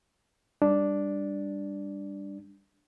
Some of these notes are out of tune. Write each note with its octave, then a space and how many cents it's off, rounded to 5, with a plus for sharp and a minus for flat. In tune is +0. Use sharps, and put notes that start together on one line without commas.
G3 +20 D4 +0